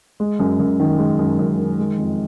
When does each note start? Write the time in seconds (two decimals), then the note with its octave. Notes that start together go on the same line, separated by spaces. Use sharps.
0.20 G#3
0.39 F#2
0.59 F#2
0.80 D#3
0.98 G#3
1.19 F#2
1.39 F#2
1.58 D#3
1.79 G#3
1.98 F2